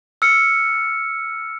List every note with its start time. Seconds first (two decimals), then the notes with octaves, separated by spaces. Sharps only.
0.22 E6 F6 C#7